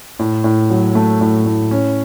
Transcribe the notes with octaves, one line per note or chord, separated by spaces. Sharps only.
A2
A2
F#3
A3
A2
A2
C#4